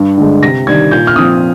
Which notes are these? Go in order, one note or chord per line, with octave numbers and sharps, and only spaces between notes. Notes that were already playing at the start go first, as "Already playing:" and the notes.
Already playing: G2
D3 G#3
C3 A#6
D#3 G3 D4 G#6
A#2 G6
F6
F3 C4 D#6